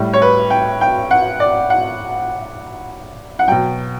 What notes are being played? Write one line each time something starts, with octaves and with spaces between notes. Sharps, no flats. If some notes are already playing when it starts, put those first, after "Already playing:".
Already playing: A2 G3
C#5
B4
G5
G5
F#5
D5
F#5
F#5
B2 F#3 G5